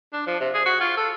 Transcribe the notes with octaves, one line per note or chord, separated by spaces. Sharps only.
D4
F3
C3
G#4
F#4
F4
A4